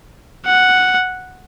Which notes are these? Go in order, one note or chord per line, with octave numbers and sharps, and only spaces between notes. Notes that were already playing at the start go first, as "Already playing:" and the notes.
F#5